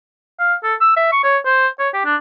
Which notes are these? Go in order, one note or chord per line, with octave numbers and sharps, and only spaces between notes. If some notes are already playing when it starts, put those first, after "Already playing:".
F5
A4
E6
E5
C#6
C#5
C5
C#5
G4
D4